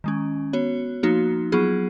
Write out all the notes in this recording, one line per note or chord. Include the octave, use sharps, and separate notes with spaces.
D#3 G#3 C#4
B3 F#4 C#5
F3 A#3 D#4 F#4
F#3 B3 F4 G#4